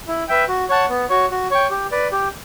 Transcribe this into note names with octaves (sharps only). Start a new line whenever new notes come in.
E4
B4 E5 G5
F#4
C#5 F#5 A5
B3
F#4 C#5
F#4
C#5 G5
G4
B4 D5
G4